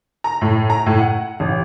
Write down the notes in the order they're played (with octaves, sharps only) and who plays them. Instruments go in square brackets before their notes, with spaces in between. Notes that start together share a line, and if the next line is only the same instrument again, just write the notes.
[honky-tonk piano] A#5
A2
A#5
A2
F#5
A1